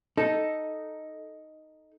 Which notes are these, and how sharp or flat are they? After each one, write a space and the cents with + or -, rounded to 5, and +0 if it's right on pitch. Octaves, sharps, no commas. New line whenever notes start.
D#4 +0 A4 +0